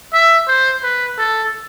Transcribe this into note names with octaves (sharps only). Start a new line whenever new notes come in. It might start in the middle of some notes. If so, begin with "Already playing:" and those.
E5
C5
B4
A4